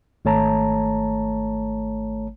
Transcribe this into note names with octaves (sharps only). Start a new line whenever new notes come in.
G#1 A3 C#5 A5 A#5